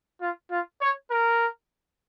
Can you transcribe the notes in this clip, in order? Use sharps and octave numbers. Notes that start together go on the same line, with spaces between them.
F4
F4
C#5
A#4